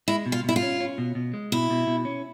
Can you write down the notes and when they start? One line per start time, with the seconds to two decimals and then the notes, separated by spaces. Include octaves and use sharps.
0.08 G#3 E4
0.26 B2
0.32 F4
0.44 B2 E4
0.56 F4
0.62 C#4
0.80 C#4
0.98 B2
1.15 B2
1.34 G#3
1.52 B2 E4
1.70 B2
1.87 B2
2.05 C#4